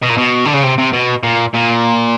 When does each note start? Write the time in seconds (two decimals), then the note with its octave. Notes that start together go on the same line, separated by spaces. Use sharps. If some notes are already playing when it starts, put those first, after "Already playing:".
0.02 B2
0.09 A#2
0.17 B2
0.45 D3
0.53 C#3
0.63 C3
0.78 C3
0.93 B2
1.23 A#2
1.54 A#2